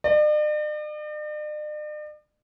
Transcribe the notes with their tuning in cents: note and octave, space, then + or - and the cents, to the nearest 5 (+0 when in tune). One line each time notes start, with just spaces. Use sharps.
D5 +45